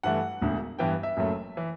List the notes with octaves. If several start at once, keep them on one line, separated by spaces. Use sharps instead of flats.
G2 E3 A3 F#5
E1 D2 D3
G2 E3 B3 G5
E5
F#1 F#2 F#3 A3
E3